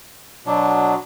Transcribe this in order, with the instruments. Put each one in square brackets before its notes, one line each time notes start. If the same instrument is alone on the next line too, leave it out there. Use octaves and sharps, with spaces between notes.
[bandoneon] B2 F#3 B3 D4